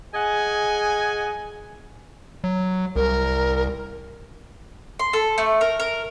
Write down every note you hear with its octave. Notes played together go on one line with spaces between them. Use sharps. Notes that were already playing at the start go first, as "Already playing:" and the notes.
G#4 D#5 F#5 G#5
F#3
C2 A#4
C6
A4
A3
A#4
A#4